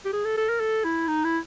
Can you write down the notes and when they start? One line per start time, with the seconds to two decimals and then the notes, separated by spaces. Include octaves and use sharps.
0.05 G4
0.14 G#4
0.25 A4
0.37 A4
0.49 A#4
0.60 A4
0.84 E4
1.08 D#4
1.25 E4